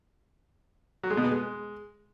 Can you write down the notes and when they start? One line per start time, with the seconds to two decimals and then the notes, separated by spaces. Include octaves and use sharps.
1.03 F#3
1.10 G#3
1.17 B2
1.24 B3
1.31 G#3